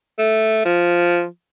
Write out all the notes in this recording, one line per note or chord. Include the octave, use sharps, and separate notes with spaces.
A3
F3